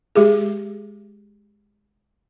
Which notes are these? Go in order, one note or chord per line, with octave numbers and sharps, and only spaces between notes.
G#3 G4 G#4